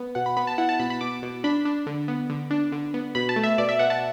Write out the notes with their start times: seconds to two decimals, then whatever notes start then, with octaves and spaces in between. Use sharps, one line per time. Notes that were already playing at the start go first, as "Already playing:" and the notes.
Already playing: B3
0.15 B2 F#5
0.26 B5
0.37 B3 B5
0.47 A5
0.58 E4 F#5
0.69 A5
0.80 B2 B5
0.90 B5
1.01 B2 D6
1.23 B2
1.44 D4 B5
1.65 D4
1.87 D3
2.08 B3
2.30 D3
2.51 D4
2.72 D3
2.94 B3
3.15 B2 B5
3.29 A5
3.36 A3
3.43 E5
3.58 B2 D5
3.69 E5
3.79 B2 F#5
3.90 A5